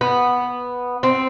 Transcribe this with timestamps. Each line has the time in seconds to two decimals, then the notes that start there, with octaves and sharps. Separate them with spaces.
0.01 B3
1.03 C4